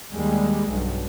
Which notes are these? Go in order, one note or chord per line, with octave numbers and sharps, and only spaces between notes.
D#2 G3 G#3
B1 G2